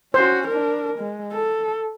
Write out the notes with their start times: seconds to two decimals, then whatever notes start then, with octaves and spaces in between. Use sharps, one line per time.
0.14 C#4 F#4 C5
0.48 D4 A#4
0.99 G#3
1.32 A4